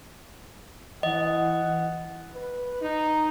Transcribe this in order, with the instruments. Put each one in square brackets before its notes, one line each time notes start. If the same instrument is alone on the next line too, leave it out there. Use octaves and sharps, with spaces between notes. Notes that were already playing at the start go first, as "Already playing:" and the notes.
[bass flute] E3 [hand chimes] D#5 [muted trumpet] F#5
[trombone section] B4
D#4